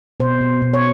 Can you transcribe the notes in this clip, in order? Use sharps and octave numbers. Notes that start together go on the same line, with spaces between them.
B2 C5
B2
B2
C#5